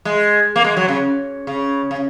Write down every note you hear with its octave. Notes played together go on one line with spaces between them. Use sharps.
G#3
A#3
G#3
F#3
C#3
C#3
C#3